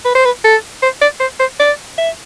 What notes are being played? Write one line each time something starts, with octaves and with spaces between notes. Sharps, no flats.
B4
C5
B4
A4
C5
D5
C5
C5
D5
E5